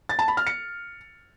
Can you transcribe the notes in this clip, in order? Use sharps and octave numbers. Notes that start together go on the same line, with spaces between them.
A6
A5
B5
F6
C#7